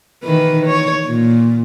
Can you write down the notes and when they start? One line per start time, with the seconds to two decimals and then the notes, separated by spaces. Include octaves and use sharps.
0.23 D#3 E3 B4
0.67 C#5
1.05 A#2